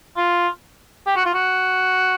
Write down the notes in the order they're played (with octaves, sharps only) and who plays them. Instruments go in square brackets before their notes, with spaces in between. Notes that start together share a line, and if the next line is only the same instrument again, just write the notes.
[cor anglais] F4
G4
F#4
F4
F#4